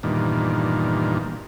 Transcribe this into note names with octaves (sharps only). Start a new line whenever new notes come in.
E2 G2 A#2 D#3